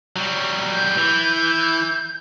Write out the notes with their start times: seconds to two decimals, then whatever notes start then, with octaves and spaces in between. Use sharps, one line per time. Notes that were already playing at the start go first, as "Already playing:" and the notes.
0.16 F#3 G3
0.74 G6
0.97 E3